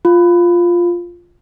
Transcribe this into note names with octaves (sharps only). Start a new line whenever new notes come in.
F4